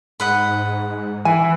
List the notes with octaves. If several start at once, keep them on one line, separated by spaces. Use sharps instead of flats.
G#2 D#5 F#5 B5
E3 G#5